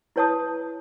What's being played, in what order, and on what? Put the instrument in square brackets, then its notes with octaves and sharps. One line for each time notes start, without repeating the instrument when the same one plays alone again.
[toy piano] E4 B4 C#5 A5 D#6